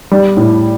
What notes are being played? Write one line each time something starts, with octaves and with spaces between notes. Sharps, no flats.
G3
A2